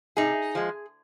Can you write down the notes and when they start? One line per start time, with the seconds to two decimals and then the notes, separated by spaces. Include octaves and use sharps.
0.17 C3 D#4 G#4
0.55 F3 G#3